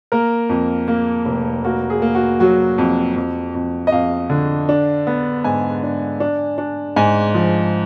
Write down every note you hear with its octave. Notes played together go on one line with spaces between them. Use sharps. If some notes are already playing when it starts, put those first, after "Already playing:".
A#3 A#4
F2
A#3
F1
A#3 F#4
G#4
A#3
F#4
F#3 F#4
F2
F2
F2
D#5
F2 F5
D3
D4
B3
G#2 G#5
D4
D4
D4
G#2 G#5
F3